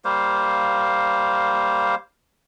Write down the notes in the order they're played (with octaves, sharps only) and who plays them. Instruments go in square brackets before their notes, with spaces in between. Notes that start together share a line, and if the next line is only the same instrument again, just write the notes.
[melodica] G3 A#3 C5 F5